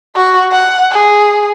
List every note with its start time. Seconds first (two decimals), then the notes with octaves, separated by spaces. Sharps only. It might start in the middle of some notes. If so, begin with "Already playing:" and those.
0.16 F#4
0.52 F#5
0.91 G#4